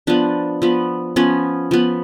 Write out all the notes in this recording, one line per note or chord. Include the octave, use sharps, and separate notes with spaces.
F3 B3 D4
F3 B3
F3 B3 C#4
F3 B3